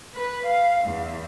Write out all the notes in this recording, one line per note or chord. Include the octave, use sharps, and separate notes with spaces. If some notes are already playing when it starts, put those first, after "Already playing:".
B4
F5
E2